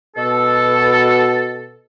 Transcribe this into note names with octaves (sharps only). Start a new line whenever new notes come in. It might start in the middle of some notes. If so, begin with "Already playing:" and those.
B2 A4